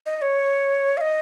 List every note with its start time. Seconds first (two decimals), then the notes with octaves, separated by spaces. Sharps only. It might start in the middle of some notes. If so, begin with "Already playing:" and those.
0.06 D#5
0.17 D#5
0.22 C#5
0.97 F5
1.01 D#5